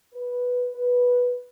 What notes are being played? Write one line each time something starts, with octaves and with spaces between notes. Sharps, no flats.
B4
B4